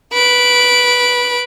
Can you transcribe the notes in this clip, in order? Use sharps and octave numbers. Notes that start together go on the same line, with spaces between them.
B4 D7